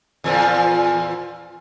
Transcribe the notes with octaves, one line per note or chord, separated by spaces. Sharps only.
E2 A#2 F3